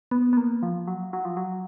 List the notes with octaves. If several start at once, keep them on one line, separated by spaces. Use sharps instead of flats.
B3
B3
A#3
F3
F#3
F#3
F3
F#3